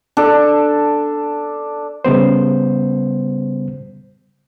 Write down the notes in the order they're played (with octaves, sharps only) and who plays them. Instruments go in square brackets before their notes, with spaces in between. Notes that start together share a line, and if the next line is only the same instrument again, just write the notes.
[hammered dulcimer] D4 A4
[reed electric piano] C#3 G3 B3 C5